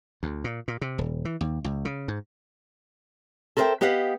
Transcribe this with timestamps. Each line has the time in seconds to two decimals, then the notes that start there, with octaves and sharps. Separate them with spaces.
0.23 D2
0.44 A#2
0.68 A#2
0.81 C3
0.98 D#1
1.25 E3
1.41 D#2
1.64 C#2
1.85 C#3
2.08 G#2
3.57 A4 A#4 C5 D5 E5 G5
3.81 B3 G4 D#5 F5 F#5